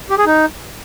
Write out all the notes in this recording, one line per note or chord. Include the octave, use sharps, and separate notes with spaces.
G4
G#4
D#4